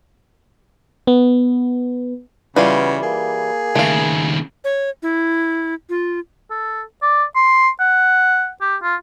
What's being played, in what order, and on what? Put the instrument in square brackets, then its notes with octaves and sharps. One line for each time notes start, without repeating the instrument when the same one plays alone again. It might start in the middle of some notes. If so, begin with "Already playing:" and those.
[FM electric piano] B3
[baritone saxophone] C#3 [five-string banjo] E3 G3 F4 [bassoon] B3
[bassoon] A#3 [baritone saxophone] G#4
[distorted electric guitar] D#2 C#3 [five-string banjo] A3 F5
[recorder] C#5
E4
F4
[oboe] A4
D5
C6
F#5
G4
F4